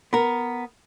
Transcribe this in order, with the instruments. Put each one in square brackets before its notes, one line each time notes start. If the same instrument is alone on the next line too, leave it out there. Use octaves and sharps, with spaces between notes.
[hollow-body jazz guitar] B3 A#4